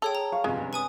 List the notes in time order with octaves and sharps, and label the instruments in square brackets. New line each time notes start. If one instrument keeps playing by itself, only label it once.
[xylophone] G#4 C#5 G5 [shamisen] A4
[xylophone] A#5
[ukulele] F5 [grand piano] C#6
[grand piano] G1 C3 F3 [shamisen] G#3 [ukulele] C#4
[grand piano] G2 C3
[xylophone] B4 G#5 D#6